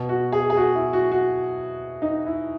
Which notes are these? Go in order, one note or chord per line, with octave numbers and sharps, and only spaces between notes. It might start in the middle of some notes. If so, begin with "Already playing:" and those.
Already playing: B2
F#4
G#4
G#4
F#4
E4
F#4
F#4
D#4
E4